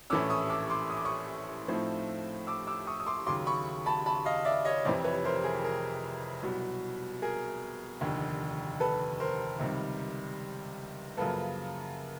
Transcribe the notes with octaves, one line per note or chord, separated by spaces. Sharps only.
A#1 A2 E3 A3 C#4 D6 E6
C#6 D#6
D6 E6
C6 D6
D#6
D6
C#6 D#6
A2 F3 A3 C4 D#4
D6 E6
D6 E6
C#6 D#6
D#6
C6 D6
D#2 C#3 F#3 C6 D6
B5 C#6
A5 B5
A5 B5
D#5 F5
D5 E5
C#5 D#5
F1 F2 C3 E3 C5 D5
B4 C#5
A#4 C5
G#4 A#4
G#4 A#4
C2 B2 F#3
G#4 A#4
F1 D#2 D3
A4 B4
A#4 C5
C#2 C3 D#3 G3
F#2 C#3 F3 A#3 A4 B4